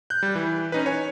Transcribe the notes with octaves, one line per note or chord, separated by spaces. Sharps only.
F#6 G6
G3
E3
C#4 D#4 B4
C#5 G#5